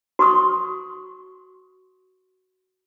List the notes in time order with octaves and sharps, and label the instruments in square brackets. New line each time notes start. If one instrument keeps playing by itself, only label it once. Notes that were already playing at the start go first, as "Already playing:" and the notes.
[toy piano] F#4 C6 C#6 D#6